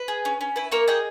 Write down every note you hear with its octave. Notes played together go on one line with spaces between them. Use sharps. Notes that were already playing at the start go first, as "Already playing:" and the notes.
Already playing: B4
G#4
C#4
C#4
E4 B4
A#3 A#4 C#5
G#4 D#5 G5